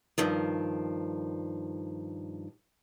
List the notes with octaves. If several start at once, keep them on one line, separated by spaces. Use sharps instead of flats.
G2 D#3 F3